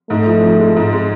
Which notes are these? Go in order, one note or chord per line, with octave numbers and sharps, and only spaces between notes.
G#2 A3
F3
F3
G#3
G#2
G#3